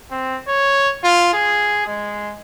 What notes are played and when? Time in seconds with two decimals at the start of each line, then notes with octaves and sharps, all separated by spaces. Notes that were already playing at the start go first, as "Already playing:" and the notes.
0.11 C4
0.48 C#5
1.04 F4
1.34 G#4
1.87 G#3